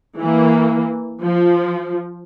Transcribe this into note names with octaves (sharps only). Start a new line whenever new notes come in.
E3 A#3
F3